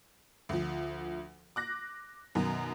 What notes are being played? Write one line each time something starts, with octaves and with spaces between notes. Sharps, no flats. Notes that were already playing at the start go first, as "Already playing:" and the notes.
D2 F3
D6 F#6 A#6
F#2 B2 D#3